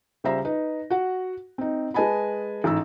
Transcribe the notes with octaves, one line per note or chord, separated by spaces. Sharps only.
C#2 G3 C5 E5 A#5 A#6
D#4 B4
F#4 F#5
C4 D#4
G#3 B4 D#5 G#5 A5 B5
A1 G#2 A#5 E6